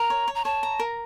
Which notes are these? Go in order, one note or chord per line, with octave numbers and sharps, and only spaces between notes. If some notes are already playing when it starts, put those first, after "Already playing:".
Already playing: A#4 A#5
C#5
C#5
A#5
C#5 A5
A#5
A#4